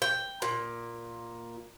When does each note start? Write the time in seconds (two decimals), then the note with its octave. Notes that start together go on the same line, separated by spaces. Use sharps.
0.02 G5
0.42 A#2